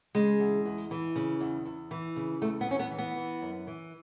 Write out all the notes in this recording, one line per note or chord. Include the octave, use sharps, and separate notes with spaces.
C#3 G#3
E2
E2
E3
C#3
E2
E2
E3
C#3
E2 A3
B3
E2 C#4
B3
E3
B3
E3
F#2
E3